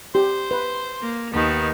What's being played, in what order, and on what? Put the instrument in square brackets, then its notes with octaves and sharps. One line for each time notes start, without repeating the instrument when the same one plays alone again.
[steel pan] G4 [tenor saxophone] C5
[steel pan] B4
[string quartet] A#3
[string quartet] D#2 D#3 [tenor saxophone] B3